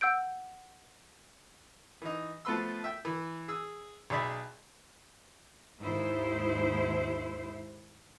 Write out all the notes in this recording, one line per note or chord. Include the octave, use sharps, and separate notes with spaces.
F#5 E6 G6 D7
E3 D#4
F3 A3 B3 B4 C6 E6
E5 G5
E3
G#4 E6
B1 G#4 D5 E5 B5
D#2 G#2 G#3 E4 C5